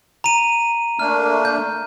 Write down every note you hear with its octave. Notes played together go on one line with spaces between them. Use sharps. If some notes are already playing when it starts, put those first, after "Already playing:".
A#5 D#7
A3 A#3 D4 F6
G6